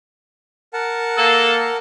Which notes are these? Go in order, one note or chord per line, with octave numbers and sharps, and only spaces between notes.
A#4 F#5 A5
A#3 A4